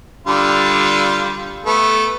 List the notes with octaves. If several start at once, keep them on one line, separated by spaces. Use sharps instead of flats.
D3 G3 F4
A3 B3